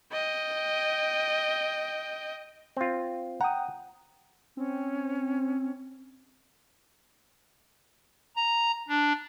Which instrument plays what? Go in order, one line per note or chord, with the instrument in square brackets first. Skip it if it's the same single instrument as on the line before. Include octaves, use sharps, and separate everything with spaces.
[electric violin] D#5 G5
[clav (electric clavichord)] C4 F4
[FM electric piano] F#5 G5 D#6 [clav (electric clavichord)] A#5
[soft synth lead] C4 [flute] C#4
[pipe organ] A#5
D4